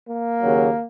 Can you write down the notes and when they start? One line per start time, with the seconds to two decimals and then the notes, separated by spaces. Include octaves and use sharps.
0.08 A#3
0.43 D#2 C#3 F#3